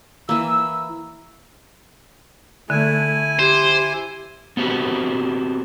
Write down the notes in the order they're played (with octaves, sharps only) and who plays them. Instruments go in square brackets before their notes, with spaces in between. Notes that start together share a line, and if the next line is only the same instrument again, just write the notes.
[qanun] E3 A#3 [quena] E6
[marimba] D3 [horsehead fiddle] A3 [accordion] E4 G#5
[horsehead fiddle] G4 [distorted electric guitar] C5
[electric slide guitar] B3 C4 F#4 G4 A#4